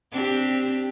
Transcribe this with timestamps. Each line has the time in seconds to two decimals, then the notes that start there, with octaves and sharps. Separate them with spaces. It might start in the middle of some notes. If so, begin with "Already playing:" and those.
0.12 C4 D4 G4